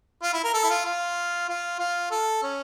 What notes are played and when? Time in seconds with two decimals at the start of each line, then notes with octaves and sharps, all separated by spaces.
0.23 F4
0.33 E4
0.44 A#4
0.54 A4
0.64 E4
0.70 F4
0.85 F4
1.49 F4
1.79 F4
2.11 A4
2.43 C#4